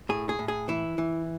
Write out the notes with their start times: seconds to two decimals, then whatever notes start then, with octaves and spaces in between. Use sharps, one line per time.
0.09 A2 G#4
0.29 G#4
0.39 A2
0.48 G#4
0.68 E3 E4
0.98 E3